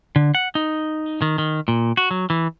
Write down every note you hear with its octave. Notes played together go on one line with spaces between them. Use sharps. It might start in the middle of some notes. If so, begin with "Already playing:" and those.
D3
F#5
D#4
D#3
D#3
A#2
F#4
F#3
E3